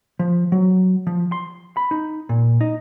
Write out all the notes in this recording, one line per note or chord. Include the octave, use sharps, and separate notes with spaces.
F3
F#3
F3
C6
B5
D#4
A#2
D#4